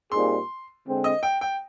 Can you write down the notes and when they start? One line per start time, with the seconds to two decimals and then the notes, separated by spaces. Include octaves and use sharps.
0.11 A#2 G3 C4 D#4 G#4 C6
0.86 D3 G#3 C4
1.04 D#5
1.23 G5
1.41 G5